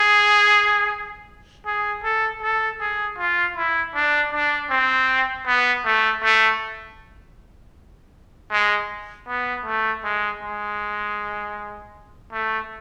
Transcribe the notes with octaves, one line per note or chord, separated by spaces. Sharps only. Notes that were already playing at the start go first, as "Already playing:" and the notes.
Already playing: G#4
G#4
A4
A4
G#4
F4
E4
D4
D4
C4
B3
A3
A3
G#3
B3
A3
G#3
G#3
A3